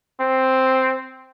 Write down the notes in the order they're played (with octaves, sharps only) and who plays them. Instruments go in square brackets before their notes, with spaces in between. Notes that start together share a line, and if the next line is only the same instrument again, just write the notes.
[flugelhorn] C4